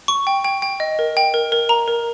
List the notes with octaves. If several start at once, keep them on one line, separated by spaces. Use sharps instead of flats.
C#6
G5
G5
G5
D#5
A#4
G5
A#4
A#4
A#5
A#4